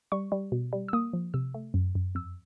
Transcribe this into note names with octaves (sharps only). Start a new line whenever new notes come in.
G3 C#6
G3
B2
G3
E6
A#3 D#6
F3
C3 E6
A3
F#2
F#2
F2 E6